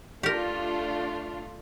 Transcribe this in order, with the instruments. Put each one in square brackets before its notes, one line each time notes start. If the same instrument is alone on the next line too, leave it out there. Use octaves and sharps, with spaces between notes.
[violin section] A3 D4 F4 [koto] G4 A#4